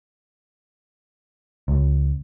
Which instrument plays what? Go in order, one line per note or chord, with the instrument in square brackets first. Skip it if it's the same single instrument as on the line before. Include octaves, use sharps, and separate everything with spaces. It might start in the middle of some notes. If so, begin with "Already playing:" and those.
[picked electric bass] C#2